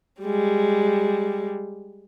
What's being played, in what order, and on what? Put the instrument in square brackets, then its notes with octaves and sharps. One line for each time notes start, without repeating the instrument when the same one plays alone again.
[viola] G3 G#3